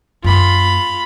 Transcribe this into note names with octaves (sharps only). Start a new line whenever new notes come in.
F#2 A#3 F4 B5